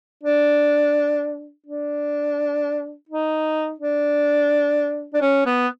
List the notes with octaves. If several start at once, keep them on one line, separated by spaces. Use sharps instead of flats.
D4
D4
D#4
D4
D4
C#4
B3